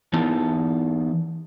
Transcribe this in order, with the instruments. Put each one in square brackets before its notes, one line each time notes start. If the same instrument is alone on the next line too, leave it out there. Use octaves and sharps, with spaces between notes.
[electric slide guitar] E3 B3 D#4 A5